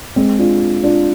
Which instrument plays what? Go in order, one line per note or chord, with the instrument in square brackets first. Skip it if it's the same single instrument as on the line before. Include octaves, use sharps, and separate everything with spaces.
[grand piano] G#3 C4
D4 F4
D4 F4